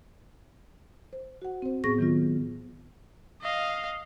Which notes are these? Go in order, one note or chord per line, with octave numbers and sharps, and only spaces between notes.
C5
F#4 F#5
C4 C5
A2 B3 C4 G#4 C#6 A#6
D#3 F#3 B3 F4
D#5 F5